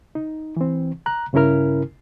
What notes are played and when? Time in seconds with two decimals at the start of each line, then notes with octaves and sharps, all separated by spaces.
0.15 D#4
0.57 E3 C4
1.06 A#5 F#6
1.33 G2 C#3 C#4 E4 A#4 F6